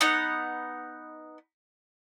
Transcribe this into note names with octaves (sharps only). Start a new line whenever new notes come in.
B3 D#4 F#5